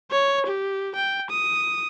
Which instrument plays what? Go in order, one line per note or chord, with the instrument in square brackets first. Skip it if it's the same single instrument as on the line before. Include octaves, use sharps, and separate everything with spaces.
[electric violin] C#5
G4
G5
D#6